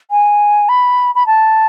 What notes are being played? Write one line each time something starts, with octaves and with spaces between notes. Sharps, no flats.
G#5
B5
B5
A5